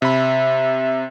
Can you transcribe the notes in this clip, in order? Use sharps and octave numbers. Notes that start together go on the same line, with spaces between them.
C3 E5 B5